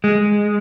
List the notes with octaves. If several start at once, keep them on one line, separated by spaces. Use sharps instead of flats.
G#3